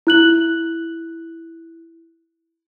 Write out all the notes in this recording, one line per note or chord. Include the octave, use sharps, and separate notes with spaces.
E4 F#6 F#7